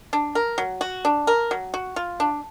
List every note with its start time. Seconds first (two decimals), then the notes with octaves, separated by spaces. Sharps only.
0.13 D4
0.35 A#4
0.58 F#3
0.81 F#4
1.05 D4
1.27 A#4
1.51 F#3
1.74 F#4
1.96 F4
2.20 D4